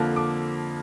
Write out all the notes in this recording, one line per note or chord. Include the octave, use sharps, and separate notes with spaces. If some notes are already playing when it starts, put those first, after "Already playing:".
Already playing: F2 D3 F3 A#3
D6